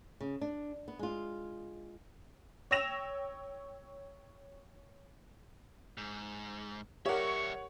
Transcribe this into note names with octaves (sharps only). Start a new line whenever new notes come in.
C#3
D4
B3
G#3 F4
C#5 G5 E6 A#6 E7 F7
G#2
G3 G4 A#4 C#5 E5 F#5 C#6